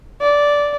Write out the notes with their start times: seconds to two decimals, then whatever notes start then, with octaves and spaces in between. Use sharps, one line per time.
0.21 D5